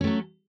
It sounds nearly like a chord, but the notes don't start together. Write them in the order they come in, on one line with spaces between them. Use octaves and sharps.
C#4 A3 F#3